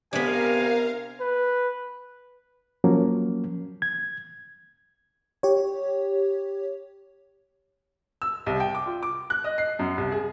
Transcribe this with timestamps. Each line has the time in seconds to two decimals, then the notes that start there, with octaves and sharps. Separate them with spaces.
0.13 C3 B3 D4 A#4 F5 G#5
1.21 B4
2.84 F3 F#3 A#3 C#4
3.82 G#6
5.43 G4 C#5
8.22 E6
8.46 C2
8.60 G5
8.75 D6
8.86 F4
9.03 D6
9.30 F#6
9.44 D#5
9.58 C7
9.79 F#2
9.98 C2
10.12 G#4